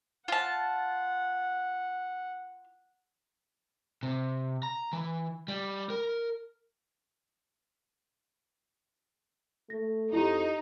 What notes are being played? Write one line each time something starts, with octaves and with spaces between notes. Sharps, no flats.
F4 F#5 A5
C3
A#5
E3
G3
A#4
A3 A#6
F2 D#4 E4 G4